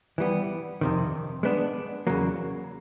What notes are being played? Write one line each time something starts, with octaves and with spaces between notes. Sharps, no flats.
E3 G3 B3
F2 C3 D#3
G#3 B3 D4
E2 C#3 F#3 A#3